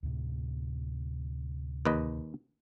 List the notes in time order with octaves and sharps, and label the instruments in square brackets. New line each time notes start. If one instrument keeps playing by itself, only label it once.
[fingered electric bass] D2 A2 C3
[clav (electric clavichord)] D#2 B4 D#5